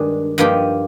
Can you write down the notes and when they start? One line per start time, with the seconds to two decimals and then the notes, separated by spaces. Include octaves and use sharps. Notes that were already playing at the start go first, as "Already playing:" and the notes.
Already playing: G2 D#3 G#3 D4 G#4
0.38 G2 F3 A#3 D#4 G4